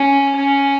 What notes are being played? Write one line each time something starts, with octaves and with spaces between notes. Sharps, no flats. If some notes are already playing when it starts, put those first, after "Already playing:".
Already playing: C#4
C#4